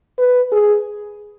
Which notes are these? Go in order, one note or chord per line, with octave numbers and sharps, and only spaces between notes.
B4
G#4